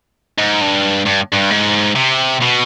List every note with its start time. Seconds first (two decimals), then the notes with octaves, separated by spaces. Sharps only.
0.38 G#2
0.61 G2
1.05 G2
1.32 G2
1.50 G#2
1.95 C3
2.42 B2